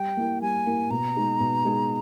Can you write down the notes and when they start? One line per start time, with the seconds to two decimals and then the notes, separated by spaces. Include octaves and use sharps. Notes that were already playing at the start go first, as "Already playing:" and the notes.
Already playing: G3 G5
0.17 A#3 E4 A#4
0.42 G3 G#5
0.66 A#3 E4 A#4
0.90 B2 A#5
1.16 G#3 D#4 G#4
1.40 B2
1.65 G#3 D#4 G#4